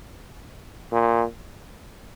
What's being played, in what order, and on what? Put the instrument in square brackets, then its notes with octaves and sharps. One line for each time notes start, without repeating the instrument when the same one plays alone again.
[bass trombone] A#2